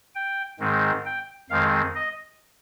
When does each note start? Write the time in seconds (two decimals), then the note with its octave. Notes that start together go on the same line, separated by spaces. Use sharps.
0.15 G5
0.60 G#2 D#3 G#3 C4
1.05 G5
1.50 F2 D#3 G#3 C4 F5
1.95 D#5